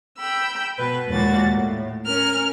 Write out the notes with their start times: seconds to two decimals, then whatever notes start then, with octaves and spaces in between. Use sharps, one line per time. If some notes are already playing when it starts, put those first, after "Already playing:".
0.17 G5 B5 E6
0.77 B2 B4
1.09 D#2 A#2 G#3 A#3 F#4 A6
1.54 A2
2.06 C#4 A#4 F6